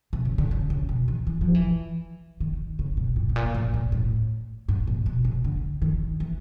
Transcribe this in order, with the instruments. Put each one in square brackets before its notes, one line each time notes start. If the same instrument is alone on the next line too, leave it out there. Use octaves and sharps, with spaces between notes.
[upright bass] C3
C#3
D3
C#3
C#3
B2
D#3
E3
F3
E3
D#3
C#3
B2
A#2
A2
A#2
A2
A#2
A2
G#2
A#2
B2
C3
D3
D#3
E3